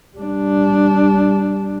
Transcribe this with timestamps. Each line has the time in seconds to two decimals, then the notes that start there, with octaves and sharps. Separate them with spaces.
0.17 G3 D4